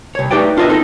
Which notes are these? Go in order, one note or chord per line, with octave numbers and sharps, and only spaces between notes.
C2 C#5
A3 D#4 G4 B4 D5 G5
D4 F4 B4 C#5 D#5 E5
C4 D#4 A4